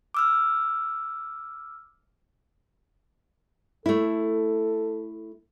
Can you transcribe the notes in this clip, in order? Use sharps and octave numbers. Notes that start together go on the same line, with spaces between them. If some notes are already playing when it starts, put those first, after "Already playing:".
D6 E6 F6
A3 E4 A4